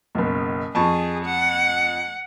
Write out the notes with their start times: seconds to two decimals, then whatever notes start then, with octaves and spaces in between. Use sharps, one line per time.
0.15 F#1 B1
0.75 F2 G#4 A5 C#6
1.25 F#5